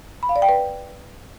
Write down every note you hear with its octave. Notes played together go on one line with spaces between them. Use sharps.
B5
F5
D5
G5
B4